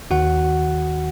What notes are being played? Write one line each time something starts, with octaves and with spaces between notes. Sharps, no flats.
D#2 D#3 F#4 F#5